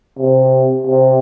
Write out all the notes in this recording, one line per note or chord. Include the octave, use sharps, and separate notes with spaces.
C3
C3